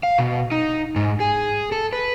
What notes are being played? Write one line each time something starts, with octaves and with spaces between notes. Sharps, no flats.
F5
B2
D#4
G#2
G#4
A4
B4